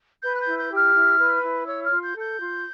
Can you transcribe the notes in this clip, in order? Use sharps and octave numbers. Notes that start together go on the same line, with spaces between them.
B4 G6
F#6
G6
E4
G6
G4
F6
E4
B4
E4
C#5 E6
F6
F4
G6
A4
G6
F4